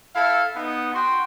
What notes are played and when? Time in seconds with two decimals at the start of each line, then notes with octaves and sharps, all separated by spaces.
0.15 E4 A4 F5
0.56 B3 D#4
0.93 F#4 G5 C6